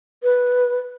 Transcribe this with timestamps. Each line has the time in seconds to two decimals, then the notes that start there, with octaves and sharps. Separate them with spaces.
0.23 B4